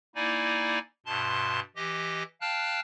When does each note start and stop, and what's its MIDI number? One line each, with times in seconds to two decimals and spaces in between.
0.15 0.79 58
0.15 0.79 63
0.15 0.79 64
0.15 0.79 74
0.15 0.79 80
1.06 1.60 43
1.06 1.60 47
1.06 1.60 81
1.06 1.60 84
1.76 2.23 52
1.76 2.23 67
1.76 2.23 75
2.41 2.80 77
2.41 2.80 79
2.41 2.80 81
2.41 2.80 89
2.41 2.80 90